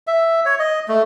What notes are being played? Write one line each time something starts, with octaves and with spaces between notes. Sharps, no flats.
E5
C#5
D#5
A3